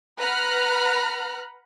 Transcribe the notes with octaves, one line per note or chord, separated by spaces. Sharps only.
B4 F#5 A#5 B5 F6 F#6